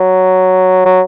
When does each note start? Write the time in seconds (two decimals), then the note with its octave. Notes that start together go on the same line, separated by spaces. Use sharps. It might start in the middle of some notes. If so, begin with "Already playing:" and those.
Already playing: F#3
0.85 F#3